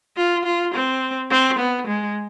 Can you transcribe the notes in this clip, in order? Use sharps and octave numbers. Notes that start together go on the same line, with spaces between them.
F4
F4
C4
C4
B3
G#3